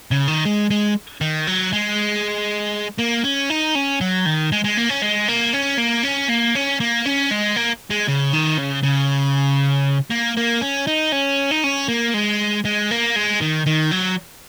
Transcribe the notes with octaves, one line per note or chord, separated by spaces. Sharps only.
C#3
D#3
G#3
G#3
D#3
F#3
G#3
A#3
C#4
D#4
C#4
F#3
D#3
G#3
G#3
A#3
C#4
G#3
A#3
C#4
A#3
C#4
A#3
C#4
A#3
C#4
G#3
A#3
G#3
C#3
D#3
C#3
C#3
A#3
A#3
C#4
D#4
C#4
D#4
C#4
A#3
G#3
G#3
A#3
G#3
D#3
D#3
F#3